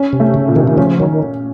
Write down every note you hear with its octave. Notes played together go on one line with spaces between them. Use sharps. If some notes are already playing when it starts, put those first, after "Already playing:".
Already playing: C#4
C3
A3
C#3
A#2
C3 D#3
D#3
C#3 F3 C#4
D#3 F#3